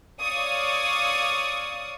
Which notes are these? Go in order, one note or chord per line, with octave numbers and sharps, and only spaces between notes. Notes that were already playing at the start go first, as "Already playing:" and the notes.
C#5 D5 F5 C#6 D#6